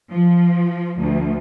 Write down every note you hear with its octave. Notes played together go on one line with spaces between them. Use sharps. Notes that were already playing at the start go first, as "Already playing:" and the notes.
F3
D2